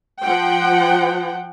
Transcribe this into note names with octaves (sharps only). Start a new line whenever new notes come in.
F3 F#5 G5